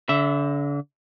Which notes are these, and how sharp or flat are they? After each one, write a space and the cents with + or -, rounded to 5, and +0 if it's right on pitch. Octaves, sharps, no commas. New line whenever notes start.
D3 -35 E5 +0